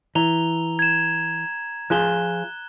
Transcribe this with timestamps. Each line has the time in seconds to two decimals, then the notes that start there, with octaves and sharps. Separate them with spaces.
0.15 E3 A#5 F7 G7
0.79 G#6 E7
1.90 F3 F4 G#4 F#6 E7 G7